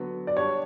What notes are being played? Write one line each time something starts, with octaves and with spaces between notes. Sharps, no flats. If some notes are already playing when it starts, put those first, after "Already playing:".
Already playing: D3 F#3 B3 F#4
D5
G3 D4 G4 C#5